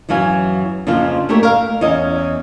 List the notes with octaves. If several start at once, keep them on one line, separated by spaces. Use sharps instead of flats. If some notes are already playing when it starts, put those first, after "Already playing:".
F#2 E3 F#3 F5 G#5
F2 C#3 F3 A#3 D4 F4
A3 A#3 G4 A#4 C#5
A#4 F5
E2 C#4 D#5